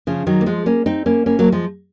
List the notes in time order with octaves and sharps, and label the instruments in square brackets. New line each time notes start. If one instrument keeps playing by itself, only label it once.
[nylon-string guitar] C#3 F3
D#3 F#3
A#3
F3 G#3
A#3 C#4
C4 D#4
A#3 C#4
A#3 C#4
F#3 A#3
F3 G#3